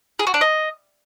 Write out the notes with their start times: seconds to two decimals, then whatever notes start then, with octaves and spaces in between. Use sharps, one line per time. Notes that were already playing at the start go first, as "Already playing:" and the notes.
0.19 G#4
0.27 F#4
0.34 D4
0.41 D#5